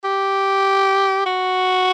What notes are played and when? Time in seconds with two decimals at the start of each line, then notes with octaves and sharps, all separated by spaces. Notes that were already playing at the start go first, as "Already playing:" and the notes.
0.04 G4
1.26 F#4